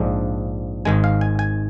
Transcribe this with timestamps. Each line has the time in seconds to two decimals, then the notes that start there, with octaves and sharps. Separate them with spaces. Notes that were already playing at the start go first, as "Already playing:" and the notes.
Already playing: A#1 G#2 F3 G#3 D4
0.85 G#1 G#2 D#3 G#3 G#5
1.04 F5
1.21 G#5
1.39 G#5